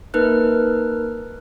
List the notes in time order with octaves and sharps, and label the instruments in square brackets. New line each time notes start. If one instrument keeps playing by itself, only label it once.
[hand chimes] A#3 D#4 A#4 B4 F#6